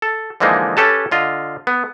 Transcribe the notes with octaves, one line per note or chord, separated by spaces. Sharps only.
A4
D3 E3 F3 G#3 A#3 D#4
C#4 G4 A4 B4 A5
D3 F4 D#5
B3